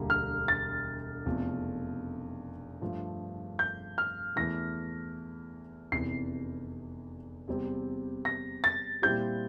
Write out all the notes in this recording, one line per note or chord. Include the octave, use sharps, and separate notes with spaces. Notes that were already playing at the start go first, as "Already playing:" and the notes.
Already playing: E1 D2 D3 G3 A#3
F6
A6
F1 E2 C3 F3 A3
G2 F3 A3
G6
F6
E2 E3 A3 A#6
F1 E2 C3 E3 C7
E2 C3 G3 C4 G4
A#6
A6
A#2 G3 C4 E4 G4 G6